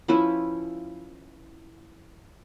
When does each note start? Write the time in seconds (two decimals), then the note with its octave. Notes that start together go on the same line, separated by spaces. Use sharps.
0.08 F3 C#4 E4 B4